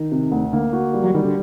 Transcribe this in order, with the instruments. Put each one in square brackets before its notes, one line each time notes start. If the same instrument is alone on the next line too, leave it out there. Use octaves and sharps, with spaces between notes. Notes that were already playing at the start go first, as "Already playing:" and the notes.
Already playing: [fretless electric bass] D#3
[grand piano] C3
D2
[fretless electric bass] D3 [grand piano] A#3
[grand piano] F#4
G3
[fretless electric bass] F#3
[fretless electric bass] D#3 [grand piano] G3
[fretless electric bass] D3